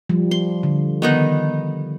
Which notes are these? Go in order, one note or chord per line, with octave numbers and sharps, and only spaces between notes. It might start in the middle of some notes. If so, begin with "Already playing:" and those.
F3 G3
C6
D3
D#3 B3 D#4